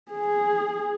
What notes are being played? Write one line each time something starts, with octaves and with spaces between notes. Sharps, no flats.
G#4